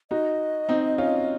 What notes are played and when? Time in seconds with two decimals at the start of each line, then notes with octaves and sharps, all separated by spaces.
0.11 D#4 F#4 D#5
0.69 C4 D#4
0.98 C#4 F4